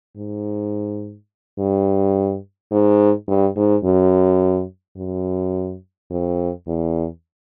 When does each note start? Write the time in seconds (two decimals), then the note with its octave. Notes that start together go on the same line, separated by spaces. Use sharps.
0.17 G#2
1.58 G2
2.71 G#2
3.28 G2
3.56 G#2
3.84 F#2
4.97 F#2
6.11 F2
6.67 E2